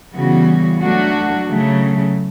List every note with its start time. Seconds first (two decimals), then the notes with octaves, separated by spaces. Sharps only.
0.13 C#3 E3 G3 B3 F#4
0.81 F#3 A3 D4 F#4
1.48 C#3 F#3 A3